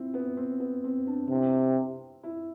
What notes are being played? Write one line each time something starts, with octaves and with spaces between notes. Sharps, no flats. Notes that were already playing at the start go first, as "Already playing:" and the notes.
Already playing: C4 E4 F4
B3
C4
B3
C4
D4
C3 E4
E4